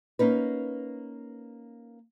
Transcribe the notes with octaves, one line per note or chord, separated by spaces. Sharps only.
A#3 C#4 D#4 B4